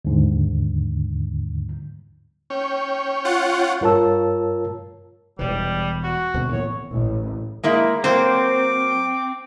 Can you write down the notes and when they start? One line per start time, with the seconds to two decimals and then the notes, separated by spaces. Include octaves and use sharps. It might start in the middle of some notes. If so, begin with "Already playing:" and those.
0.05 D#2 G#2 D3
2.50 C#4 C#5 G5
3.25 F4 F#5
3.81 G2 F4 A#4 C#5 A5 E6
5.39 E1 E3 G3
6.03 F#4
6.34 D1 B2 C4
6.52 A2 E3 B3 C#5
6.90 A1
7.64 G#3 A#3 E4
8.04 F#3 A#3 C4 C5 D6